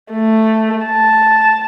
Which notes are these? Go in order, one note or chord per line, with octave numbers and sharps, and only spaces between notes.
A3
A5